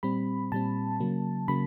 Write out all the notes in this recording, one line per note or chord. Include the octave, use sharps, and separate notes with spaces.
A#2 G3 C4 B5
A#2 G3 C4 A5
C#3 F#3 A#3
C#3 F#3 A#3 B5